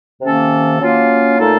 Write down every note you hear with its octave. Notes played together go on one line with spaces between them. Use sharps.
C3 D#3 A#3 C#4 A4
F#3 A#3 C#4 F4
A#2 A3 D#4 A4